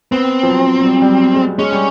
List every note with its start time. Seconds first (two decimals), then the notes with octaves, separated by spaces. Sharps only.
0.11 B3 C4
0.43 F3
0.48 F#3
0.80 F#3
0.85 G3
1.02 G3
1.09 F#3
1.34 G#3
1.58 G#3 C#4
1.73 G3